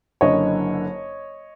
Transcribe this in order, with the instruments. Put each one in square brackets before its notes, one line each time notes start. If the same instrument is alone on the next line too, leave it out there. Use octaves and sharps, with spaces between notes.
[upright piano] F#1 F#2 D3 C#5 D#5